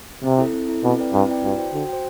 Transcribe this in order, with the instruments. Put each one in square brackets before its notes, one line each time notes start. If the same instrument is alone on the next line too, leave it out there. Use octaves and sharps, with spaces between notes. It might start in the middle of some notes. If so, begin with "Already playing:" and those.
[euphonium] C3 [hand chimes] C4
[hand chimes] E4 A4
C4
E4 A4
[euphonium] B2 [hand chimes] C4
[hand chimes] E4 B4 D5 G5
[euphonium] G2 [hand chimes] C4
[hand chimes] E4 B4 D5 G5
[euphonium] G2 [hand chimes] F#4
[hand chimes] C5 G5
[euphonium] D3 [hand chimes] F#4
[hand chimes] C5 G5